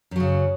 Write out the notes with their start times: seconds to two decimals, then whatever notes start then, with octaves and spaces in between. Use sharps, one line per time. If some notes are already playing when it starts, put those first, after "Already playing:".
0.11 F#2
0.16 F#3
0.20 C#3